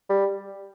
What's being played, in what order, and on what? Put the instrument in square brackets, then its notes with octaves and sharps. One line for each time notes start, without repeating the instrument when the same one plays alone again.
[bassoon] G3